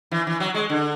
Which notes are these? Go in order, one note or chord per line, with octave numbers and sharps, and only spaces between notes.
E3
E3
F#3
G#3
D3